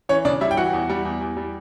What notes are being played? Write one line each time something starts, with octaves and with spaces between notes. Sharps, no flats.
E3 C#4 C#5
C#3 D4 D5
G3 E4 E5
G5
E3 F#4 F#5
E2
G3
E2
E2
G3